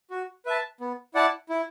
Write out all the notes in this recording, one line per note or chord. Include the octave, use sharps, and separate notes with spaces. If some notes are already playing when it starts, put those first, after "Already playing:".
F#4
B4 E5 A5
B3
E4 D5 F#5 A5
E4